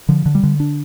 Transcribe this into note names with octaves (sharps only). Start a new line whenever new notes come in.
D3 F3
D3
G3
D3
D4